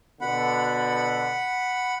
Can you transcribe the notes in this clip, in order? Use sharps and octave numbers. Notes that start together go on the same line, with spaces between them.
B2 D3 F#5 B5